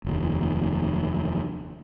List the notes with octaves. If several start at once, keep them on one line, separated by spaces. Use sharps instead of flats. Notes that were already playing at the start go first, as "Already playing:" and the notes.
F1 D#2